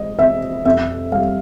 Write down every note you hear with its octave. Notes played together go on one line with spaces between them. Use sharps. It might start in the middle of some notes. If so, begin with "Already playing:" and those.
Already playing: G#3 D#5
C4 E5
F2 E5
G3 F5